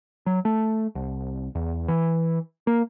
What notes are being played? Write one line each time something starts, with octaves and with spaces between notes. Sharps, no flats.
F#3
A3
C2
E2
E3
A#3